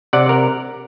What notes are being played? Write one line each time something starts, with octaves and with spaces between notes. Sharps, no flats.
C3 D5 F#5
A#4